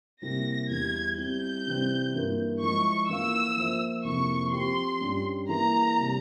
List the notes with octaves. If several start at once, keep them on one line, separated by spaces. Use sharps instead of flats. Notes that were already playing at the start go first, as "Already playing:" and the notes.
C3 G3 A#3 E4 G4 A#6
E2 E3 G3 G#6
G3 C4 E4 G6
C3 E3 G3 C4
G2 E3 A#3 F4 A#4
F3 G#3 E4 C#6
E3 A#3 F4 A#4 F5 E6
F3 A#3 F4 C5 E5
F2 C3 F3 A#3 E4 C#6
F3 C4 G4 C6
G2 G3 C#4 F4
E3 A#3 E4 G#4 A#5
C3 G3